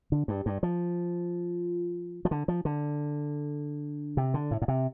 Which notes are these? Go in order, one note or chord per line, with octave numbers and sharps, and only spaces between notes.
D3
G2
G2
F3
F3
D3
F3
D3
C3
D3
A2
A2
C3